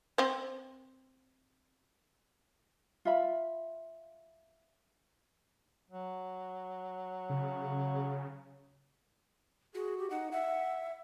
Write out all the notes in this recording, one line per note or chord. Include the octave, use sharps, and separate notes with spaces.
C4 C5
F4 E5 B5
F#3
C#3
F#4 G#4
G4
D#4 F#5
E5 F#5